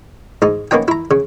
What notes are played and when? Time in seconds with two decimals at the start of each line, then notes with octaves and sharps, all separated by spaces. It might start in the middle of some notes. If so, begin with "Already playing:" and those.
0.42 G#2 D#4
0.71 A#3 B3 C#4 D#4 G5
0.88 E4 A#5
1.11 C#3